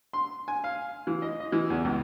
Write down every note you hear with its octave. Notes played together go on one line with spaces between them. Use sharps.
C6
G#5
F5
E3
D#5
D#5
E3
E2
C#2